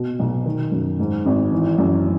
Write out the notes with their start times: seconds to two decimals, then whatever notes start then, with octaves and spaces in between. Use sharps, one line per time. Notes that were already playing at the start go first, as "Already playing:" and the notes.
Already playing: B2
0.19 B1
0.46 D#3
0.72 F#2
0.99 G#2
1.25 G#1
1.52 E3
1.78 F#2